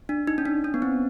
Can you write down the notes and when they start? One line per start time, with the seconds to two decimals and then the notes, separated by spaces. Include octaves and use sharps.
0.09 D4
0.27 D#4
0.38 C#4
0.45 D4
0.64 C#4
0.74 B3
0.82 C4